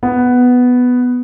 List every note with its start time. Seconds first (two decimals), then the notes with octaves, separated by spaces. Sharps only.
0.03 B3